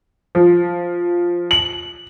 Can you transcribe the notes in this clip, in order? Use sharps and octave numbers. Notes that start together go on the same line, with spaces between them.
F3
F#7